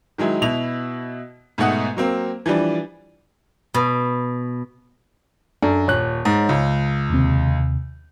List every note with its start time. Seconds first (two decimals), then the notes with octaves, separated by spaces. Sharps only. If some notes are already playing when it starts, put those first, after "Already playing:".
0.18 D#3 F#3 G#3 E4
0.42 B2 E4 F7
1.58 G#2 B2 A3 F#5 D#6
1.97 F#3 A#3 C4
2.46 E3 F3 G3 D4
3.74 B2
5.62 F#2 D4 A4
5.88 D#1 C#5 F#6
6.25 G#2
6.49 C#2
7.10 D#2 C3